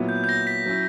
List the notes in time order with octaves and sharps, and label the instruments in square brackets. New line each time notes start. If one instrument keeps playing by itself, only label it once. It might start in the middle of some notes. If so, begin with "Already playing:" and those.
Already playing: [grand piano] A#2 F#3 B3 E4
[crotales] G6
G6
A#6
B6
[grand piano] F#3 C#4 E4